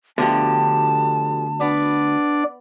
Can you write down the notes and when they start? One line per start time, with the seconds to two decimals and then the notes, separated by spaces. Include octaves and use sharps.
0.18 D2 B2 D3 F3 G4 A5
1.61 B3 D4 D5